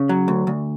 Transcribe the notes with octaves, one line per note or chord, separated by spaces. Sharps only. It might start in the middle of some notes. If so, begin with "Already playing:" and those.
Already playing: C#3
F#3
D2
D2